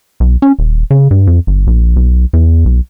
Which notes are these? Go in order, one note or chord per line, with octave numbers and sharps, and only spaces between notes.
B1
C#4
D#1
C#3
G2
F2
G1
A#1
B1
E2
B1